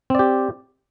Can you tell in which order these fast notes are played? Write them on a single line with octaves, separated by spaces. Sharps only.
C4 D5 G4